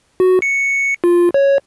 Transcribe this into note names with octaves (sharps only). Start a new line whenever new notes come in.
F#4
C#7
F4
C#5